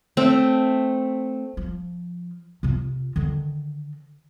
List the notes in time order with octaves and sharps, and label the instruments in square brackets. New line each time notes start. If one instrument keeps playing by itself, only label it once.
[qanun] A3 C4
[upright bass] F3
C3 F4
D3 D#3